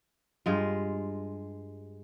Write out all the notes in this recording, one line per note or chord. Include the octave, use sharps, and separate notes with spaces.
G2 G#3 F4